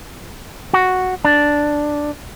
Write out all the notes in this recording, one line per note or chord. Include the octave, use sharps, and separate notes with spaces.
F#4
D4